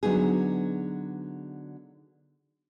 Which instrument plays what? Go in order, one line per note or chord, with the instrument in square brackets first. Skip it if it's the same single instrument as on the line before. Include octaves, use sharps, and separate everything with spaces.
[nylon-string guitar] D3 F#3 B3 D#4 G#4